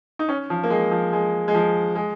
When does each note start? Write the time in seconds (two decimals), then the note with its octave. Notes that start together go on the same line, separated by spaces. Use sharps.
0.19 D#4
0.29 C#4
0.50 F3
0.63 A#3
0.70 G#3
0.91 F3
1.13 G#3
1.48 G#3
1.54 F3
1.96 G#3